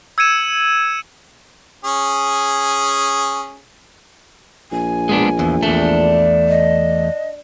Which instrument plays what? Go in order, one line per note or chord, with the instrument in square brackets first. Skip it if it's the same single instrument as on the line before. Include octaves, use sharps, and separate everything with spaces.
[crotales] E6 G#6 C#7 D#7 E7
[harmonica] C#4 G#4
[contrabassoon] A#1 [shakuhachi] G#5
[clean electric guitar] G#3 B3 D4
[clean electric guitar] E2 [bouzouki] E3 F3
[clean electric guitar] E2 A3 [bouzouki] D4
[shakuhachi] D#5